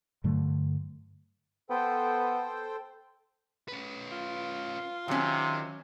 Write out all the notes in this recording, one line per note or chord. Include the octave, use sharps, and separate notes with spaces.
G2 D3 F#3 A3
B3 A4 C5 G5
C#4 B4
F4
C3 D#3 F#3 C#4